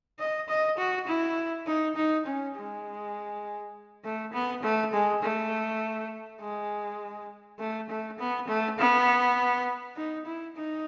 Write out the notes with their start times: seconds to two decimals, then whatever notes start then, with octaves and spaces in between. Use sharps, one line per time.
0.19 D#5
0.49 D#5
0.78 F#4
1.08 E4
1.67 D#4
1.96 D#4
2.26 C#4
2.56 G#3
4.04 A3
4.34 B3
4.63 A3
4.93 G#3
5.23 A3
6.41 G#3
7.59 A3
7.90 A3
8.19 B3
8.48 A3
8.79 B3
9.97 D#4
10.26 E4
10.56 D#4